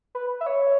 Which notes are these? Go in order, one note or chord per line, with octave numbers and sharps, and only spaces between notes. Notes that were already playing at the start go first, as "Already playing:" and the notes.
B4
E5
C#5